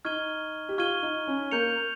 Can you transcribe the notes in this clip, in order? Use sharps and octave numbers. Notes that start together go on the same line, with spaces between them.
D#4 C#6 F6 G#6 D#7 G7
G4
F4 C#6 F6 G#6 D#7 G7
D#4
C#4
A#3 G6 C#7 F7